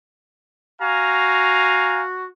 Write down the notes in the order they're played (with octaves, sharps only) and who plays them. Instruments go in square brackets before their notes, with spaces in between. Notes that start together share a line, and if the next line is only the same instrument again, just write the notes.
[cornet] F#4 [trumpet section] F5 G#5 A#5